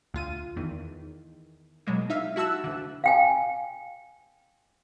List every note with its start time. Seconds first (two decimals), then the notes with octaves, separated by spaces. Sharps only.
0.14 D2 F4 D#7
0.56 E2 D#3
1.87 B2 F#3 G#3 A#3
2.10 D#4 E5 F5
2.36 E4 F#4 A5 E6 F#6
2.64 D2 D3
3.04 F5 G5 G#5